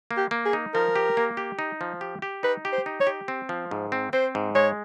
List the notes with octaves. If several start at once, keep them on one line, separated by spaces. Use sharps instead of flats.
A#3
G4
A#3
G#4
D#4
F3 A#4
G4
A#3
G4
D#4
F3
G4
G4
D#4 B4
G4
C5
D#4
C#5
G4
C4
F3
G#2
C4
C4 C5
G#2
G#3 C#5